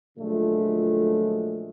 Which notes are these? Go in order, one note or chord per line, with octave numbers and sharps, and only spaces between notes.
A#2 D3 F3 F#3 G#3 A3